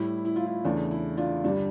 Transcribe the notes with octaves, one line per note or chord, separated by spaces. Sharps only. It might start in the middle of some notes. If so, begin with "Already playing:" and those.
Already playing: A2 G3 E4
E4
F4
E4
E2 C#3 E3 A3 D4
E4
D4 F4
G2 D3 G3 D4